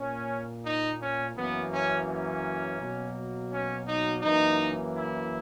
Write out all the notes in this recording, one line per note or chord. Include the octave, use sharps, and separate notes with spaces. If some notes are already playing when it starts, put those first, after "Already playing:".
Already playing: A#2 A#3 C#4
D#4
C#4
F#2 E3 A#3 B3
C#4
C#4
B2 F#3 A#3
C#4
D#4
F#2 E3 A#3 D#4
E4